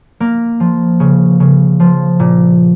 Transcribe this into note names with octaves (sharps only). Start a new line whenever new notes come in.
A#3
F3
C#3
C#3
F3
A#2